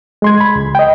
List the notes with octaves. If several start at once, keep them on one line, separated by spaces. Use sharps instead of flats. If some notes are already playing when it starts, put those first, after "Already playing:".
G#3 C6 G#6
B5
C#2
D#5 G5